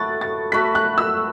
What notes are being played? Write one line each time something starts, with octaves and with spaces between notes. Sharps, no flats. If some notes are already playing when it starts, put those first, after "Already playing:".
Already playing: A3 F#4 B4 F#6 A6
A6
A3 F#4 B4 B6
F#6
E6